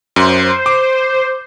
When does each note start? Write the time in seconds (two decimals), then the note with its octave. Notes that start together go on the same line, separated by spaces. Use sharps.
0.16 F#2 C5
0.66 D6